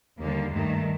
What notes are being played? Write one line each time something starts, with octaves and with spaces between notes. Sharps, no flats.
D#2 D3 G3 A#3
G2 D#3 G3 A3